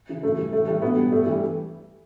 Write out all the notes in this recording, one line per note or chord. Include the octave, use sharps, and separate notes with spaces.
C#3 E3
F#2 A3
E3 G3
A2 A3
E3 G3 A3
B2 B3
G3
G2 A3
E3 G3